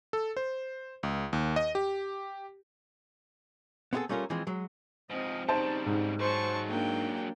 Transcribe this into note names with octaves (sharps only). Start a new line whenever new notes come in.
A4
C5
C#2
D#2
D#5
G4
B3 C4 E4 F#4 G#4 A4
G3 A3 C#4 F4 A#4
E3 F3 G#3 C4
F#3 G#3
G#2 F3 C4 D#5
C#3 G3 D#4 C5 A5
G#2
F#3 G#3 C5 A5 C#6
A#3 D4 G5